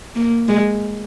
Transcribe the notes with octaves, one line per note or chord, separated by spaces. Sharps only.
A#3
G#3